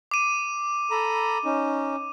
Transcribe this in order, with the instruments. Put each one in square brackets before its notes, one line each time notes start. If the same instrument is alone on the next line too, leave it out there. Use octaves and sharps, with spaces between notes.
[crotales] D6 D#7
[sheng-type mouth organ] A4 A#5 B5
C#4 D#4